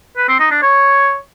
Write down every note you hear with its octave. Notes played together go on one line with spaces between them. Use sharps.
B4
C4
D#4
D4
C#5